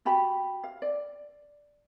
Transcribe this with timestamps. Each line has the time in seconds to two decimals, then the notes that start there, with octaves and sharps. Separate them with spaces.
0.05 F#4 G4 A5 B5
0.64 F5
0.82 D5